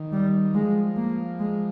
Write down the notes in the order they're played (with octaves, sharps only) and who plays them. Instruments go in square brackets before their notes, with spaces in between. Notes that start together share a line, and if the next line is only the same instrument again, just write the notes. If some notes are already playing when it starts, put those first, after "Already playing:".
Already playing: [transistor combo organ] D#3
[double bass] G3
[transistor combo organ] F3 [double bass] G#3
[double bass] A#3
G#3